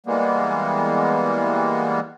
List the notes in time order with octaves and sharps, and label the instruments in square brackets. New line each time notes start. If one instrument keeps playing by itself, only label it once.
[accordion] E3 G3 G#3 A#3 B3